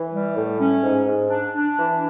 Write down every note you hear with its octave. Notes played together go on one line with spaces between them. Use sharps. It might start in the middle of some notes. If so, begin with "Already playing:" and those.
Already playing: E3
G3
A2
C#4
G#2
G#2
D4
D4
E3